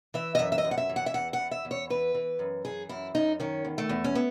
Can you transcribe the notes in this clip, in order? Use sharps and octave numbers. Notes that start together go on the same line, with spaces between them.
E3 E5
D#5
F#2 E5
E5
D#5
F#2
F#5
E5
E3
F#5
E5
E2 F#5
F#5
E2
E5
E2
C#5
E3 B4
E3
F#2
E3 G#4
F#2 E4
F#2 D#4
D#3 C#4
E2
A3
E2
C#4
B3